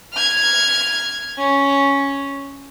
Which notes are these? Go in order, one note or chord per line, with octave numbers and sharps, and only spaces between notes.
F6 G#6
C#4